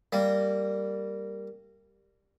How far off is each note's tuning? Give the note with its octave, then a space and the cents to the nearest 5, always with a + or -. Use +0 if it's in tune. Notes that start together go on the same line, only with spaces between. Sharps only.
G3 +0 A#3 -15